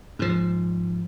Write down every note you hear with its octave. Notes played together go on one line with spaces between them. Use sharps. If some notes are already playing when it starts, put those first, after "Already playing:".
G#2 F3